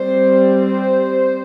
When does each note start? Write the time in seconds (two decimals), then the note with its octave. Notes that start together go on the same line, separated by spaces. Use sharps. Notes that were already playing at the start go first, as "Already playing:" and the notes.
Already playing: G3 C4 C5
0.59 C5